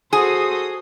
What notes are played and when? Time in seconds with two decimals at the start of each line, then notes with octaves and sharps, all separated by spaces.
0.13 F#4 G#4 A4 C5 D#6